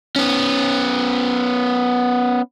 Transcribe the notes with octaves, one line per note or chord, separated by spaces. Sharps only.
B3 C#4